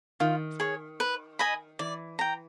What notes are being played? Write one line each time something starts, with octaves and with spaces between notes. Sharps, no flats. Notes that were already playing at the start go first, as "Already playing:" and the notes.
D#3 F4
G#4 C#5
B4
D#5 G#5 B5
E3 D5
G5 A#5